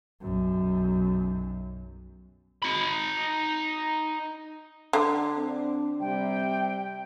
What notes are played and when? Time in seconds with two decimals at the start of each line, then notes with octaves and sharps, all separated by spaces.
0.21 B1 F#2
2.62 D#4 B5
4.93 D3
5.36 C4 D4
6.00 C3 G3 G5